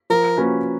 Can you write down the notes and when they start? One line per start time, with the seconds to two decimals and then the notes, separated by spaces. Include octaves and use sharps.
0.10 F3 A#4
0.37 A#3 C#4 F#4 B4